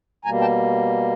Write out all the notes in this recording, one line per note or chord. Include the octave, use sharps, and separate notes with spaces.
B2 G3 A#3 G#5 A#5
G5 A5